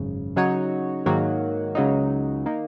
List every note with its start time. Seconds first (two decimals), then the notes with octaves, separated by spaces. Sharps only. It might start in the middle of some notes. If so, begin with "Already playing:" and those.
Already playing: G#1 F#2 C#3
0.36 C#3 F#3 D#4 F#4 C#5
1.06 G#2 D#3 F#3 A#3 F#4
1.75 C#2 C#3 F#3 D#4
2.46 D#3 A#3